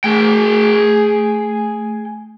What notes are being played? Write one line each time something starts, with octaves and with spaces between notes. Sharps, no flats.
A3 G#4 G5